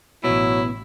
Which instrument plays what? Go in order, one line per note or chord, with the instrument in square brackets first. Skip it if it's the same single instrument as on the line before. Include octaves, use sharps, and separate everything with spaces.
[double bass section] A1 [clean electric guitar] B2 [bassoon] F#3 [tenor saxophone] E4